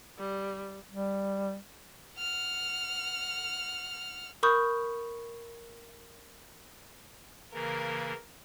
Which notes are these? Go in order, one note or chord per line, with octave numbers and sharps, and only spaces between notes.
G3
G3
F#5 F6
A#4 B5 C#6 D#6 G6
C#3 E3 A#3 A#4